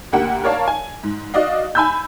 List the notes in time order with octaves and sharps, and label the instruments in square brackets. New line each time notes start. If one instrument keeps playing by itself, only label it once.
[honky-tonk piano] D2 A#3 G4 F#5
A#4 C#5 D5 F5 A5
G#5
G#2
F#4 D5 D#5 F5
G#5 B5 E6 G6